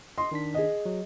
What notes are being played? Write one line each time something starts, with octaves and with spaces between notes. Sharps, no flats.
D#5 C6
D#3 D4 B6
G#4 D#5
F#3